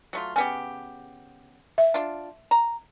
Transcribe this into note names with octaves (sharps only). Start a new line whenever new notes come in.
F#3 A3 F4
C#3 B3 G4 G#5
E5
D4 F4
A#5